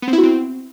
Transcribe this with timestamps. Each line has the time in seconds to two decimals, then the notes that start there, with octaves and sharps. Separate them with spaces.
0.02 B3
0.08 C4
0.13 E4
0.18 F#4
0.23 C4